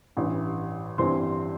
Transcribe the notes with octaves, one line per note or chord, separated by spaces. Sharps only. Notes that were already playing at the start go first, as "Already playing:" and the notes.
A1 G2 E3
G1 G2 E3 G3 C4 C5 C6